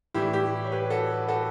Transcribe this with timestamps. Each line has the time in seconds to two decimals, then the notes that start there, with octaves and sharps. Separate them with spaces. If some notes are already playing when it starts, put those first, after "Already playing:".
0.14 A2 E3 G3 E4 G4
0.33 E4 G4
0.64 C#5
0.72 G4 B4
0.90 F#4 A4
1.28 F#4 A4